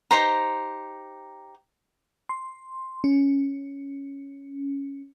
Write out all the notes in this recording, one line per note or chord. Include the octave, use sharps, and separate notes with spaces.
D#4 G4 C5 A#5
C6
C#4